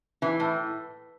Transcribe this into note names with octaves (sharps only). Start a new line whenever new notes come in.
E3
A2